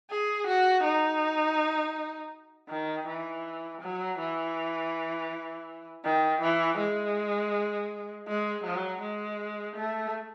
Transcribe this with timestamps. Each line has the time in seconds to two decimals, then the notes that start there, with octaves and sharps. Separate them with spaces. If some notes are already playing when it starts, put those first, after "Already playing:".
0.10 G#4
0.47 F#4
0.84 D#4
2.69 D#3
3.08 E3
3.82 F#3
4.19 E3
6.04 D#3
6.42 E3
6.78 G#3
8.27 G#3
8.64 F#3
9.01 G#3
9.76 A3